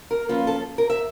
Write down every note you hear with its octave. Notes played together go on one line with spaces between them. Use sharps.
A#4
F3 A#3 C#4 F4 B4
A4
A#4
E5